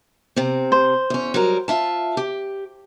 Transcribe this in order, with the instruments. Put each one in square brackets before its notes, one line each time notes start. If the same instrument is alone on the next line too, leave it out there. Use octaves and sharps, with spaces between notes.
[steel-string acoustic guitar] C3 C4
[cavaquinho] C5
[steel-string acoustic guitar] E2 C#4
F#3 G3 A#4
F4 E5 A5
G4